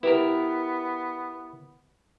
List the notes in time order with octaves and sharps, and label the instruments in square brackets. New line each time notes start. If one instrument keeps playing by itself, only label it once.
[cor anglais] B3 [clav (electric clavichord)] E4 G4 A#4 [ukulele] B4